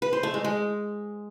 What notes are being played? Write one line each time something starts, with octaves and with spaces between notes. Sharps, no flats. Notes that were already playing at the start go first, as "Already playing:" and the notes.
B4
C5
A3
G#3
G#3